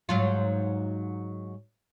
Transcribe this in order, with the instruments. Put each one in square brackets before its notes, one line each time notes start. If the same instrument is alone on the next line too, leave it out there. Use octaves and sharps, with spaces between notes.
[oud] G#2 F#3 F4